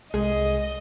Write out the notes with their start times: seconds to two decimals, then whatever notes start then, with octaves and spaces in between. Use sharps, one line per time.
0.14 C2 G#3 G#4 D#5